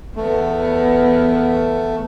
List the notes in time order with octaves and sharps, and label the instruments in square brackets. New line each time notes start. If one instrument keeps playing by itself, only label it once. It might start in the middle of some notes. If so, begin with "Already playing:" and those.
[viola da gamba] E2 B3 [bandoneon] A3